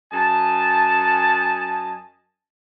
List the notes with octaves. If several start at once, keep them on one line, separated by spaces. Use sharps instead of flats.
F#2 D#5 G#5 A5